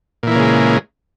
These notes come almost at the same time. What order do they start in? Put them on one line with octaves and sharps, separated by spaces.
A#2 E3 A#3 C#3 G#3